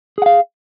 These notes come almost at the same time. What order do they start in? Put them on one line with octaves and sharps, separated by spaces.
G#4 F#5 F5